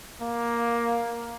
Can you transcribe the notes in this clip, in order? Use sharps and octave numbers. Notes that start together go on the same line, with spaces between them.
A#3